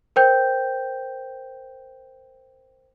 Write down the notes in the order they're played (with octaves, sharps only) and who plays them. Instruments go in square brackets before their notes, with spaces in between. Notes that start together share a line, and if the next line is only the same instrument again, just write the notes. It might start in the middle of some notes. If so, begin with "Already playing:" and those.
[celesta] A#4 C5 G5 G6